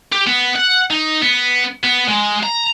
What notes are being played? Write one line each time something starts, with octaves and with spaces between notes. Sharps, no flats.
G4
B3
F#5
D#4
B3
B3
G#3
A#5